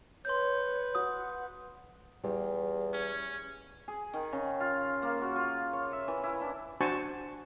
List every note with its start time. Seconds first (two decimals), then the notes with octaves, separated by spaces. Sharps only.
0.25 B4 C#5 C6 G6
0.95 F#4 F#5 D#6
2.24 E2 G3
2.93 C#4
3.88 G#4
4.14 D#3
4.33 C#3
4.60 F4
5.02 A#3
5.21 F#4
5.36 F4
5.73 C#5
5.93 E5
6.08 E3
6.24 E4
6.41 D4
6.81 D4 F#4 C5 G#5 A5 C#6